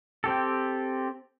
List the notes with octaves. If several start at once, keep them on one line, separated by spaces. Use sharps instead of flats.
C4 G4 A4